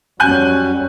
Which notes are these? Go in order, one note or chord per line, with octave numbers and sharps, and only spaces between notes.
F2 F#3 G3 C#4 F#4 G#5 F#6 G6